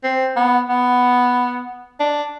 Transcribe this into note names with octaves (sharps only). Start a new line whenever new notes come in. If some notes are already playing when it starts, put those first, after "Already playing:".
C4
B3
B3
D4